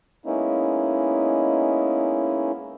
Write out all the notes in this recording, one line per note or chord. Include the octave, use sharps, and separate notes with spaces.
G#3 A#3 B3 C#4 D#4 E4